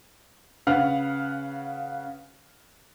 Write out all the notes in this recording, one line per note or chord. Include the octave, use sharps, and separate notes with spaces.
C#3 B4 F5 F#5 F6